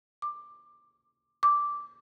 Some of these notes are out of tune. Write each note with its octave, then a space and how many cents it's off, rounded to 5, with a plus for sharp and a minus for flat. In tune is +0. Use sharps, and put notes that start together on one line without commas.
D6 +15
D6 -10